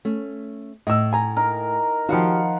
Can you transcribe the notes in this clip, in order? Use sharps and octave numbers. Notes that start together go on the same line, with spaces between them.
A3 C#4
A2 D#5 E6
G#5 A#5
D#4 A#4
D#3 F3 F#4 G4 F5 F#5 B5